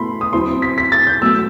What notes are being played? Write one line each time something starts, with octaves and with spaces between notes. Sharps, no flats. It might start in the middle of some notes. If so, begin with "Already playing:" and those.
Already playing: B2 A3 E4 B5 C6
D#6
F#3 C4 E4 C6
B6
B6
A6
G6
B2 F#3 A3 E6